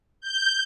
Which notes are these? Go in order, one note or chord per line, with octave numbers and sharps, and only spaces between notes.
G6